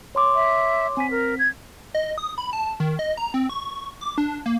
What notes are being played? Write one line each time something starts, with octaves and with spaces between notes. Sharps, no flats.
C#5 C6 D6
E5
C4 G#5 B6
A#4
G#6
D#5
D#6
B5
A5
D#3
D#5
A#5
C4
C#6
D6
D4
A#3